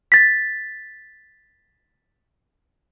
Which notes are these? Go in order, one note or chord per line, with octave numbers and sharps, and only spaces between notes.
A6 B6